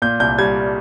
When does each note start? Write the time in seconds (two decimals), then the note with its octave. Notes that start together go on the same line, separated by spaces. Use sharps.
0.02 A#2 G6
0.20 C2 G6
0.38 G3 G#6